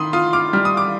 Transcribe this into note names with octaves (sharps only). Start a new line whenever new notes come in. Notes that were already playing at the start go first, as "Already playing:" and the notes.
Already playing: D#3 B5 C6 D#6
F4 C6 D#6
D6 F6
G3 F6
D#6
D6